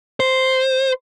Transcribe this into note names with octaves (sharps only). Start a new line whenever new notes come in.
C5